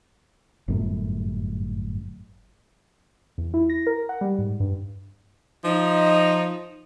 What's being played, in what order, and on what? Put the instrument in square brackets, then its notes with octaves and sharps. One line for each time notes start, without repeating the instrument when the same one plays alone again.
[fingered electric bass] G1 F#2 A2
[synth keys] E2
E4
A#6
A#4
F#5
G3
G#2
G2
[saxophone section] F3 D#4